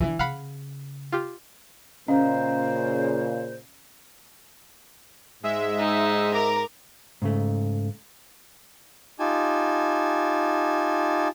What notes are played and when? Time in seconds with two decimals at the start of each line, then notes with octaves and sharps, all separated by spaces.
0.01 D3 E3
0.19 C#3 F5 F#5 B5
1.12 F4 G4
2.08 A#2 C#3 C#4 C5 D#5 F5 A#5
5.43 G#2 G#3 E5
5.79 D#4
6.33 A#4 A#5 D6
7.22 G#2 C#3 A3
9.19 D#4 F4 G4 G#5 A5